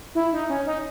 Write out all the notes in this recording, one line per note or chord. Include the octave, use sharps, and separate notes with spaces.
E4
D#4
C#4
D#4